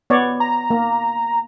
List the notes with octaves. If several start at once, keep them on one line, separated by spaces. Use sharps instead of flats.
B3 C#5 D5
A#5
A#3